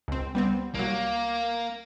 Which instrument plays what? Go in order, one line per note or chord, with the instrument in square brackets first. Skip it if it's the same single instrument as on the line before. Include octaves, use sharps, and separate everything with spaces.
[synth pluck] C#2 C4
G3 B3 C4
[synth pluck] C2 F#3 [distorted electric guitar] A#3